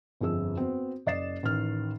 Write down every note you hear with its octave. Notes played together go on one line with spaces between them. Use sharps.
G1 F2 F3 G#4 E6
B3 C4 F#4
F#1 D5 D#5 A6 C7 E7
A1 D#3 F6